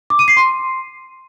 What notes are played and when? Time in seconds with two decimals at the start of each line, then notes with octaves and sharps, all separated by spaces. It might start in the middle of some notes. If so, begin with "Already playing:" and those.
0.10 D6
0.19 D#7
0.28 C7
0.37 C6